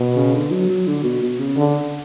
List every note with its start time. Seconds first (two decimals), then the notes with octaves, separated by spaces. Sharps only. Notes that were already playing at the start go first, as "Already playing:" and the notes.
Already playing: B2
0.16 C#3
0.34 D3
0.51 F#3
0.69 F#3
0.87 D3
1.03 B2
1.22 B2
1.39 C#3
1.57 D3